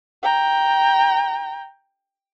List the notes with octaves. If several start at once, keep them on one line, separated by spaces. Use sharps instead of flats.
G5 A#5